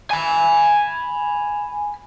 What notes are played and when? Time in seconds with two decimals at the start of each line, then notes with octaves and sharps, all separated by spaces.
0.10 G#5 B5